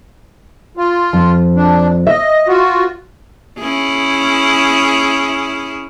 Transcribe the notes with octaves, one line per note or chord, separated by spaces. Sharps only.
F4
F2
D4
D#5 E5
F4 F#4
C#4 E4 G#4